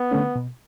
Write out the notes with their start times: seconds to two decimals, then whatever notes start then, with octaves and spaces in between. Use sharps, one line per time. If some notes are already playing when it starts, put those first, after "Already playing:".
Already playing: B3
0.11 D3 A3 C#4
0.36 B2